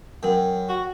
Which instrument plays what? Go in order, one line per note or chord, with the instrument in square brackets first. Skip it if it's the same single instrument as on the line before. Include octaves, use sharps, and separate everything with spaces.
[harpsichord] F#2 [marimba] F#5 G5
[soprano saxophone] F#4